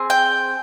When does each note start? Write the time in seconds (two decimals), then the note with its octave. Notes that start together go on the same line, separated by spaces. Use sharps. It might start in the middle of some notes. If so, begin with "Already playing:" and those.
Already playing: C4 G#4
0.10 G5